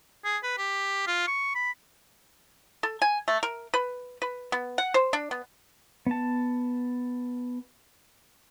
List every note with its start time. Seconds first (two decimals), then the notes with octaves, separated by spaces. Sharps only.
0.25 G#4
0.43 B4
0.58 G4
1.07 F4
1.28 C#6
1.55 B5
2.83 A4
3.02 G#5
3.28 A3
3.43 A#4
3.74 B4
4.22 B4
4.52 B3
4.78 F#5
4.94 C5
5.13 D4
5.31 B3
6.06 B3 A5